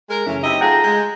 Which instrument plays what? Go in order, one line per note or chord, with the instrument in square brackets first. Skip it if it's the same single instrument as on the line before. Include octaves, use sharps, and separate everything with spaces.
[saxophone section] G#3 A#4
[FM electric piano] F#2 C#3 [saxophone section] E3 A3 C#4
[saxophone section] C3 E4 D#5 [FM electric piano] D#4 E5
[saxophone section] A3 F4 G#4 [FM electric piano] F#5 G5 [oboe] A#5
[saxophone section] G#3 [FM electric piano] G6